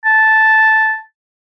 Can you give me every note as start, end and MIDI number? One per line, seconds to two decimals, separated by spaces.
0.05 0.98 81